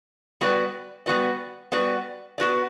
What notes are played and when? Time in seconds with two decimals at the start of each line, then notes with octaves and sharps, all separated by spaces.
0.41 G3 B3 F#4 B4 D5
1.06 G3 B3 F#4 B4 D5
1.72 G3 B3 F#4 B4 D5
2.38 B3 F#4 B4 D5